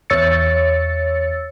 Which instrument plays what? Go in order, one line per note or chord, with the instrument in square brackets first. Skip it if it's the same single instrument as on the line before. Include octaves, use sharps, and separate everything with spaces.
[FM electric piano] E2 C#5 E6 A6 C#7